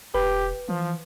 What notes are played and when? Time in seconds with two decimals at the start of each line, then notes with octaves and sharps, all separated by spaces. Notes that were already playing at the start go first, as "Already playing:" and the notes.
0.14 E1 G4 B4
0.69 E3 F3